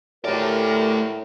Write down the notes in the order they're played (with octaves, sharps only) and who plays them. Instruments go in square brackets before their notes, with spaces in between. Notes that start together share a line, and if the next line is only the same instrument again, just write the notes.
[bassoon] A2 [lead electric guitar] A3 D5 [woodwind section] G4 A#4